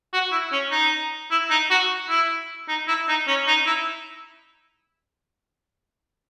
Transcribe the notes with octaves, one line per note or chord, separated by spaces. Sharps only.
F#4
E4
C#4
D#4
E4
D#4
F#4
E4
D#4
E4
D#4
C#4
D#4
E4